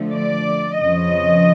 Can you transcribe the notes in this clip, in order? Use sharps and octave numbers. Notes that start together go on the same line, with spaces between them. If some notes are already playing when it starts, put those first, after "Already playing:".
Already playing: D3 F3 A3
D5
F2 C#3 F3 D#5